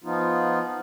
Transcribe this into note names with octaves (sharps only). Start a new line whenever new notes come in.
F3 B3 D#4 F4